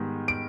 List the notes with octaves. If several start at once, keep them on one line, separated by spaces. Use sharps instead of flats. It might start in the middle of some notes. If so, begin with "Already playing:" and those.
Already playing: G#2 D#3 G3 B3
D7